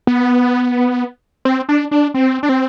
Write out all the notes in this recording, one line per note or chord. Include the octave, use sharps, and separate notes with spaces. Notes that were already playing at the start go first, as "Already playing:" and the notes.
B3
C4
D4
D4
C4
D4
C4